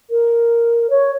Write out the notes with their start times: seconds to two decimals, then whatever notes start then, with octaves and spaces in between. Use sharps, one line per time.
0.10 A#4
0.90 C#5